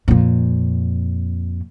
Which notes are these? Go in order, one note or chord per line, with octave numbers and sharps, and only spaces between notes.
F2 A#2